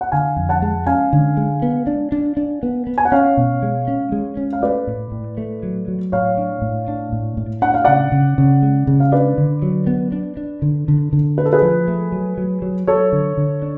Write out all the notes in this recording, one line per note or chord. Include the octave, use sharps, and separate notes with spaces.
F#5
D3 F5 G#5
F2
F#5 A5
G#3
C#4 F5 G#5
D3
G#3
B3
D4
D4
D4
B3
B3
G#5
F#5
C#4 C#5 F5
B2
G#3
C#4
G#3
C#4
F5
A3 B4 D5
A2
A2
A3
F#3
F#3
A2 C#5 F5
D4
A2
D4
A2
A2
D4 F#5
F5
C#3 D5 F#5
C#3
C#3
G#3
C#3
F5
D4 B4 D5
D3
F#3
B3
D4
D4
D3
D3
D3
A3 B4
A4
G#4 B4
F3
A3
F#3
F#3
F#3
F#3 A4 C#5
D3
D3
D4